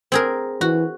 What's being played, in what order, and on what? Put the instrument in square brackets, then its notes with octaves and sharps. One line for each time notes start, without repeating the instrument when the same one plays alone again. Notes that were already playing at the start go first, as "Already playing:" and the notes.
[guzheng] C4 G#4 A#4
[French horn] E3 [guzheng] F#4